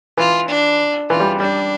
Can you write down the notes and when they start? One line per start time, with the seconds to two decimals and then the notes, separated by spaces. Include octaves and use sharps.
0.17 E3 F4
0.48 D4
1.10 E3 F4
1.20 G3
1.40 G3 D4